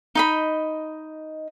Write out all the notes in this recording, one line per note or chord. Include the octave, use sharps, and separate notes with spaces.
D#4 D#5 B5